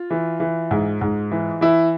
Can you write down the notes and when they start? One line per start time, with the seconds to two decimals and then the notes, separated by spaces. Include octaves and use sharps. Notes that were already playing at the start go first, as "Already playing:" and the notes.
Already playing: F4
0.10 E3
0.40 E3
0.71 G#2
1.01 G#2
1.31 E3
1.61 E3 E4